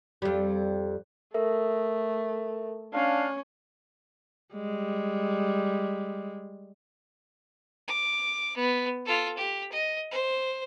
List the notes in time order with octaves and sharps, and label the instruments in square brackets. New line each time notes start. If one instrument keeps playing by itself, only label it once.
[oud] F2 G3
[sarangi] A3 [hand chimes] A4 A#4 E5
[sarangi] C#4 [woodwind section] D4 F5
[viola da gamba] G3 G#3
[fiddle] D6
B3
F4 A4
G4
D#5
C5